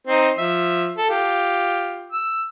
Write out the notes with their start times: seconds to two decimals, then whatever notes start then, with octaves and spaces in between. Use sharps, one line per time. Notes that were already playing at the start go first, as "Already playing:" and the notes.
0.07 C4 D#4 C5
0.38 F3 E5
0.97 A4
1.10 F4 G4
2.12 E6